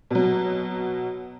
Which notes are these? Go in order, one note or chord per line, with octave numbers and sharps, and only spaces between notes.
B2 F#3